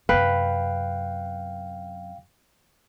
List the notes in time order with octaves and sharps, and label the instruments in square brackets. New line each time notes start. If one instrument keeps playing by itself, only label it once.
[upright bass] F#2 C3 [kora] B4 [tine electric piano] F5 G5